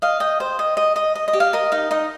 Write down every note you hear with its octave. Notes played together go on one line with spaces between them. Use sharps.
D#5 F5
D#5 G5
C5
D#5
D#5
D#5
D#5
D#5
G4
F5
A#4 D#5
D#4 F5
D#4 D#5